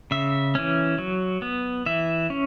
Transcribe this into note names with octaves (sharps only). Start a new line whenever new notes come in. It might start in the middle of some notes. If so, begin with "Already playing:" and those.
C#3 E5
E3 C#4
F#3
B3
E3 E5
C#4